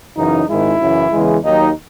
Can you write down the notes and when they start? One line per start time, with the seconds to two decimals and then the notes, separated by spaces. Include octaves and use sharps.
0.16 F#2 C#3 E3 D#4
0.48 G#1 G#2 D#3 G#3 E4
0.80 F#2 C#3 E3
1.12 E2 C#3 E3 G#3
1.43 D#2 D#3 F#3 D#4